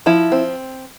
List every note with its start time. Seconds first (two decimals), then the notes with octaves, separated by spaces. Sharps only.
0.06 F3 E4
0.32 C4